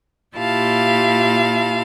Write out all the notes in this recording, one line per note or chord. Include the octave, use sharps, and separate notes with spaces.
A#2 E4 F4 G4 F5 A5